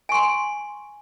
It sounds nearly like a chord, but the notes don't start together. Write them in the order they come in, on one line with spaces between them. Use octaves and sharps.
G#5 C#6 C6